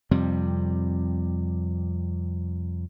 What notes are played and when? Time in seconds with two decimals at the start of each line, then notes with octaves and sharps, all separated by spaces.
0.11 F2 C3 G3